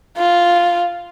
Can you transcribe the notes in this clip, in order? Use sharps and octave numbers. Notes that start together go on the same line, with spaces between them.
F4